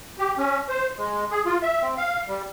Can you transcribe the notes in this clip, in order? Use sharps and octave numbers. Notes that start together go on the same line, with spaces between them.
G4
C#4
C5
G#3
G#4
F4
E5
C4
F5
G3